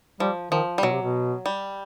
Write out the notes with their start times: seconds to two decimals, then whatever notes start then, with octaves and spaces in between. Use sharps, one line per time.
0.20 F3 G3
0.51 D#3 F3
0.78 G3
0.83 B2 F#3
0.92 C3
1.01 B2
1.46 G3